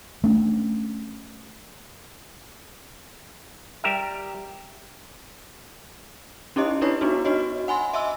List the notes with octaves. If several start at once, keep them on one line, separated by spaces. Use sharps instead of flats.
A3 C#4 D4
G3 G4 A#4 E5
C#4 D#4 E4 G4 D#5
D4 E4 B4 C#5
B3 D4 D#4 F#4
D4 F#4 C#5 D#5
F#5 G#5 B5 C6
D#5 E5 G#5 C6 E6